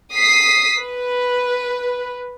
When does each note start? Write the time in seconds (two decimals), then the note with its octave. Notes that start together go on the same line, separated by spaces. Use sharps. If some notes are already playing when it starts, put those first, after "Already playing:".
0.13 D#6 B6 C7
0.79 B4